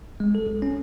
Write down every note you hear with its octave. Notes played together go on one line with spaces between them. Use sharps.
G#3
A4
B1
C#4